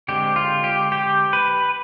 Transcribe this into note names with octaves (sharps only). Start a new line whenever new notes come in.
D3 G#3 C4 G4
F4
G4
G4
B4